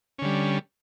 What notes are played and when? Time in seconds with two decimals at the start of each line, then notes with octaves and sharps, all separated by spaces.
0.19 C#4
0.22 D3
0.25 G3